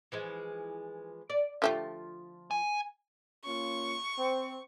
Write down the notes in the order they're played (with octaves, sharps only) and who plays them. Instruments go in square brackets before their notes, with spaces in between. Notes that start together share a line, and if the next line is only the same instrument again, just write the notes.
[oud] E3 F3 G#3
D5
[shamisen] D3 A3 G4 [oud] F3 F4
[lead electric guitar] G#5
[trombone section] A#3 C#4 F4 [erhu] C#6
[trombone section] C4